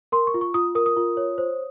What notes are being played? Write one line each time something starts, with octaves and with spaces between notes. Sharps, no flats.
A#4 C6
C#6
F4
C#6
F4 D#6
A#4 D#6
D#6
F4
C#5
C5